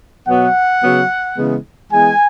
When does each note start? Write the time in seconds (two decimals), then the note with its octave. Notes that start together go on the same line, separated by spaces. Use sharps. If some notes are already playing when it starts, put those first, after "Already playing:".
0.28 B2 F#3 B3 F#5
0.82 C#3 F#3 B3
1.37 C#3 E3 G#3 B3
1.92 E3 G#3 B3 G#5